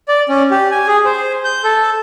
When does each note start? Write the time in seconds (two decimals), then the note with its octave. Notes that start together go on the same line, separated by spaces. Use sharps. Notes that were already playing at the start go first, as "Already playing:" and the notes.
0.08 D5
0.29 C#4
0.51 G4
0.71 G#5
0.87 G#4
1.05 C5
1.45 G6
1.64 A4